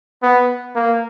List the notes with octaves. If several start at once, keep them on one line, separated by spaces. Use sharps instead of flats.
B3
A#3